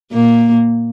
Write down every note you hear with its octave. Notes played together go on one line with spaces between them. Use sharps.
A#2 A#3